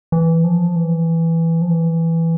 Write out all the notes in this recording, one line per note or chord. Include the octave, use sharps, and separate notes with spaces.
E3
F3
E3
F3
E3